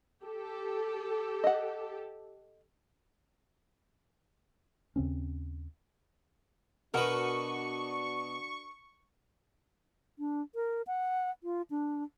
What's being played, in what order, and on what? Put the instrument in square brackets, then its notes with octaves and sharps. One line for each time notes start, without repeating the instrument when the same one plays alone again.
[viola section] G4 A4
[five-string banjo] D#5 F#5
[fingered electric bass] D#2 C#3 C4 C#4
[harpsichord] B2 B4 [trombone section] D4 F#4 [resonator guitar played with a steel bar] A#4 F#5 [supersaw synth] C#6
[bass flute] D4
A#4
F#5
F4
D4